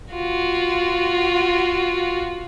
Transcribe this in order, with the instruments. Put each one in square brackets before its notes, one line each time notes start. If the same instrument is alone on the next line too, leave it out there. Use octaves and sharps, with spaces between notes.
[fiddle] F4 F#4